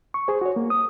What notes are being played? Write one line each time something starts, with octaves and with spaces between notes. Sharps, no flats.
C#6
G#4 C5
F#4 C#5
A#3
D#6